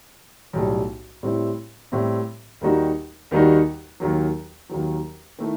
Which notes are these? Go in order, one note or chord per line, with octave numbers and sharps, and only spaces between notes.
B1 A2 G3
A2 G3 C4 E4
A2 G3 C4 E4
D#2 D#3 G3 D#4 F#4
D#2 D#3 G3 D#4 F#4
D#2 D#3 F#3
D#2 D#3 F#3
D#3 A3 E4